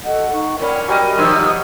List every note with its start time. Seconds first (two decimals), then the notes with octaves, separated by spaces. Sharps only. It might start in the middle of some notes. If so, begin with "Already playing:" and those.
0.04 F#4 A4 D#5 F#5
0.32 D#4 C#6
0.59 A#2 C#4 A#4 D5 G5 B5
0.88 F#3 G3 D#5 G#5
1.18 G2 D#3 F3 G4 C5 C#5 E6